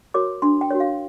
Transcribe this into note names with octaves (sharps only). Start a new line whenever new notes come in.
F#4 A#4 C#5 D6
D4 C6
G5
F#4 A#4 C#5
F5